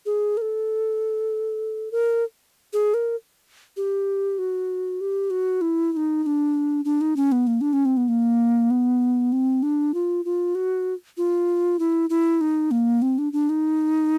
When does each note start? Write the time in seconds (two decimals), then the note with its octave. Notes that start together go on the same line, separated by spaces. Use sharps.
0.06 G#4
0.37 A#4
0.42 A4
1.92 A#4
2.73 G#4
2.94 A#4
3.77 G4
4.39 F#4
5.01 G4
5.30 F#4
5.61 E4
5.92 E4
5.97 D#4
6.23 D#4
6.26 D4
6.85 D4
7.01 D#4
7.16 C#4
7.32 B3
7.47 A#3
7.61 D4
7.73 C#4
7.85 C4
7.97 B3
8.08 A#3
8.71 B3
9.32 C4
9.63 D4
9.94 F4
10.25 F4
10.55 F#4
11.17 F4
11.79 E4
12.10 E4
12.41 D#4
12.71 A#3
13.02 C4
13.18 D4
13.33 D4
13.49 D#4